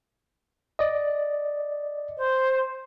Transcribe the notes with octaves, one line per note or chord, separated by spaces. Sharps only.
D5 D#5
C5